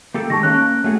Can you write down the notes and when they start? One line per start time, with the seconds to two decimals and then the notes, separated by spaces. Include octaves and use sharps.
0.14 A#3 G4 A4
0.30 D#3 G#3 A5 C#6 A#6
0.43 A#3 C#4 F#6
0.84 A3 F#4 G#4